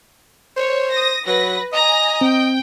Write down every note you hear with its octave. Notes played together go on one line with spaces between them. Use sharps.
C5 C#5
D#6 A#6
F#3 B4 A#6
D#5 G#5 A#5 A#6
C4 G5